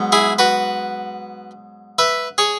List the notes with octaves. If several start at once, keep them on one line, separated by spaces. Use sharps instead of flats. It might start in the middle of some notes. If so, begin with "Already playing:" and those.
Already playing: G#2 F#3 B3
E4 G#4
F#4 B4
B4 E5
G#4 C#5